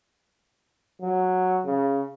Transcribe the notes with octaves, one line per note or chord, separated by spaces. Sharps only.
F#3
C#3